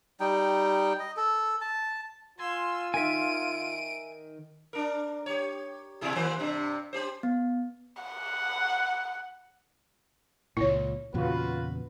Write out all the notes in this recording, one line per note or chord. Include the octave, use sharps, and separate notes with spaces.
G3 D#4 G5
D#5
A4
A5
F4 G#5 C6 E6
D#3 E5 G#5 D7 D#7
D4 A#4
G4 C#5
B2 E4 G#4
D#3 A#3 C5
G2 C3 D4
C#4 G4 C5
B3
F#5
C#2 A#2 E4 C#5
E2 A#2 C#3 F4 F#4 B4